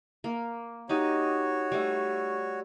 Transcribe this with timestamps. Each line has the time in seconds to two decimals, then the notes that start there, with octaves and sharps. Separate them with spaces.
0.24 A#3
0.89 D#4 F#4 G4 C#5 D#5
1.72 G3 A3